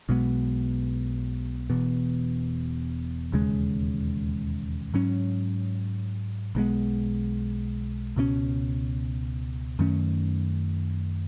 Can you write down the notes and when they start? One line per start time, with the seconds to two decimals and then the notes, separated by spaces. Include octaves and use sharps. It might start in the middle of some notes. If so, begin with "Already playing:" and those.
0.09 B1 B2 G#3 B3
1.70 E1 E2 B2
3.32 E1 D#2 C#3 G#3
4.94 G#2 F#3 C#4
6.55 B1 B2 G#3 B3
8.16 C#2 B2 G#3 C#4
9.79 F#2 D#3 A3 C#4